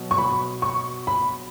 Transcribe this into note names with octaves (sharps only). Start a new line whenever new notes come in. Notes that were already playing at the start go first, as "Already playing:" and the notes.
Already playing: B2 F#3
C#6
B5
C#6
B5